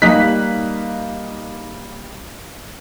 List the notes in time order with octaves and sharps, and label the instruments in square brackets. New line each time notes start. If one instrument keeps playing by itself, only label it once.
[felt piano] G3 A#3 [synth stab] D#4 [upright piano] D#5 F5 F#6 [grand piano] B6